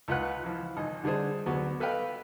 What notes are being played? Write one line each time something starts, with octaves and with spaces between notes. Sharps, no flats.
C#2 F4 B4 F#5 F#6
E3 F3
G#1 D#5
D3 G3 D4 G#4 C5
D2 F#3 B3 F#4
A4 B4 D#5 F5 G5